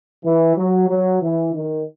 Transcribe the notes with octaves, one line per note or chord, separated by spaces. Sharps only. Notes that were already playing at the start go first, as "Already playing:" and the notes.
E3
F#3
F#3
E3
D#3